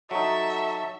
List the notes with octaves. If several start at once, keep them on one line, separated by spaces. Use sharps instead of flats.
F#3 D#4 F#4 A4 E5 A5 C#6